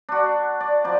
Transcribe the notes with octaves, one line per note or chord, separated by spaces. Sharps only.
D4 F#4
D5
F3 D#4 D5